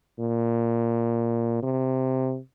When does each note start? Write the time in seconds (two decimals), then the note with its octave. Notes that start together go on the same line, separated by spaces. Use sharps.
0.20 A#2
1.63 C3